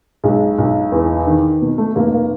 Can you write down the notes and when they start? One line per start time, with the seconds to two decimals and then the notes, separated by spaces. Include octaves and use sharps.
0.24 B1 G#3
0.58 B1
0.92 E2
1.27 D#3
1.62 B2
1.78 A3
1.96 F1 A#3
2.12 A#3